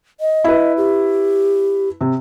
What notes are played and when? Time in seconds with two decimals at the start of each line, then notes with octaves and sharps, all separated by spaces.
0.20 D#5
0.44 E4 B4
0.77 G4
2.01 C3